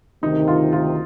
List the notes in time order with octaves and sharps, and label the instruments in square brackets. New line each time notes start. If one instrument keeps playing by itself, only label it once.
[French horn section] D2 C3 D#3 [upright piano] D#4
[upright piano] F4
F4